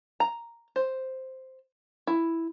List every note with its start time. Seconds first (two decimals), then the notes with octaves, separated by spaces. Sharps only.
0.20 A#5
0.76 C5
2.07 E4